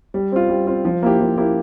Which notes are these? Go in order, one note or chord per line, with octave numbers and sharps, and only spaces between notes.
G3
C4 F4
G3
C4 F4
F3
A#3 E4 G4
F3
A#3 E4 G4